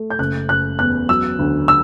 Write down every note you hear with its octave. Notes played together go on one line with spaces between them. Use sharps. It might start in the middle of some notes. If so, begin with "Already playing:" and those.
Already playing: A3
G6
F#1 F#6
F#1 F#6
E2 F#6
F#3 E6
D2
E6